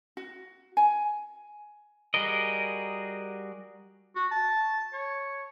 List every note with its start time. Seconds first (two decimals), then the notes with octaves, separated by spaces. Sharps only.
0.17 F#4
0.77 G#5
2.14 G3 F#4 G#4 A#4 D#5
4.16 F#4
4.31 A5
4.93 C#5